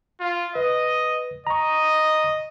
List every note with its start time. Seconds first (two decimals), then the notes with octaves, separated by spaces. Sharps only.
0.20 F4
0.55 B4 D#5
1.47 D#5 A#5 C#6